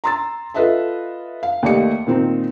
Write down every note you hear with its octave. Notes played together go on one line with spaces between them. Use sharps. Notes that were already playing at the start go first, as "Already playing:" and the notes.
A#5 C6 E6 A6
F4 A4 B4 D#5 E5 A5
F5
D#2 A3 G4 D5 D#5 C#7
A#2 D#3 C4 D#4